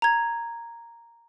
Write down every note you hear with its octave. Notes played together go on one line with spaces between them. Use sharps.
A#5 G#6